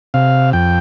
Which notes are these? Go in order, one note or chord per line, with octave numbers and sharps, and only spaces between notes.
C3 F5
F2 G5